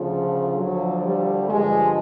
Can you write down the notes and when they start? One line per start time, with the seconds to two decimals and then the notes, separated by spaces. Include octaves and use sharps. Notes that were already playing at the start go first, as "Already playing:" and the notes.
Already playing: D2 C#3 F3
0.56 D2 D3 F3 F#3
1.02 G3
1.48 G2 D3 F3 G#3